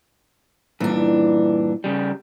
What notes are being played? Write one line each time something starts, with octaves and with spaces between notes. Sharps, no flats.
G2 A#2 E3 D4
C#3 G3